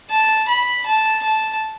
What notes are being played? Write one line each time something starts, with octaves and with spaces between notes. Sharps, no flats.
A5
B5
A5
A5